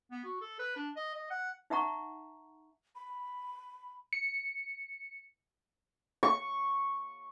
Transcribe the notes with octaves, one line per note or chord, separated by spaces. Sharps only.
B3
F#4
A4
B4
D4
D#5
D#5
F#5
D#4 E5 F#5 A#5 C#6
B5
C#7
C#6